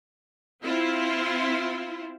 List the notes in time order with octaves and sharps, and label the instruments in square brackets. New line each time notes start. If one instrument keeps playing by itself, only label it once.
[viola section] C4 E4 F4